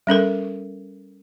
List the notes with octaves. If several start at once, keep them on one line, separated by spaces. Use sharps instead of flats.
G3 C#4 A4 A#4